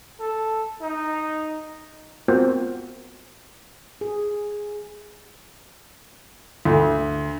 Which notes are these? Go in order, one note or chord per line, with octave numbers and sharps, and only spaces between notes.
A4
D#4
B3 C4 F4 F#4 A#4 C5
G#4
D2